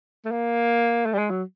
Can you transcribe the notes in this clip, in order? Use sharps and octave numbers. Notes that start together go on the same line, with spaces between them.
A3
A#3
A3
G3
G#3
F#3